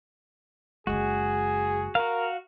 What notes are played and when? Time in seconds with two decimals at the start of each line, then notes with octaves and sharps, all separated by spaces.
0.87 F#1 C2 G#3 F#4 G#4
1.95 F#4 A#4 F5